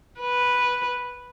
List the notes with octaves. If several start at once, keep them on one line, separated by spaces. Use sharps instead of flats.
B4